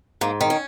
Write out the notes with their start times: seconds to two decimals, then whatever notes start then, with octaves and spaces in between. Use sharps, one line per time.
0.21 G#2 A#3
0.41 D#3
0.50 C#4